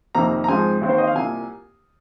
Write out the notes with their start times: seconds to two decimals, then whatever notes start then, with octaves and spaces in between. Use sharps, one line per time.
0.15 F2 C3 D#3 A#3 A#5
0.44 A#5
0.48 G#2 F3 G#3 C4 G#5
0.81 D#2 D#3 C4
0.89 C5
0.98 D#5
1.07 F5
1.15 C2 A#2 A#3 G#5